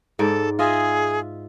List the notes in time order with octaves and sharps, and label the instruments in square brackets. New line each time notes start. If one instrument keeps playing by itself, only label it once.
[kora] G#2 D5 [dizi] A4
[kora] F4 D#5 E5 [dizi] G#4